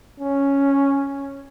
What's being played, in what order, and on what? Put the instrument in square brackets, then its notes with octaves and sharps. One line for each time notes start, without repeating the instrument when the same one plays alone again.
[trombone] C#4